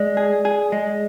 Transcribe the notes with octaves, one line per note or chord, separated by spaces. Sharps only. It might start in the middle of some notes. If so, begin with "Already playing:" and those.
Already playing: G#3 D5
G#4
G#4
G#3